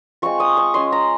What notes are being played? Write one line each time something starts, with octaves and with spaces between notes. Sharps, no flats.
G#3 C4 F4 C#6
D#6
C#6
G#3 C#4 F4 C6
A#5